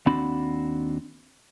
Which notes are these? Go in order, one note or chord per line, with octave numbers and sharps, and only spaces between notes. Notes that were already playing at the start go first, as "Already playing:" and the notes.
D#2 C4 D4 F#4 B5